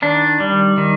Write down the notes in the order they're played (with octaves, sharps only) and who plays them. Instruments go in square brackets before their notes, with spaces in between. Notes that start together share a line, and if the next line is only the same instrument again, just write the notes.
[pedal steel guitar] D#3 D4
G3
D#3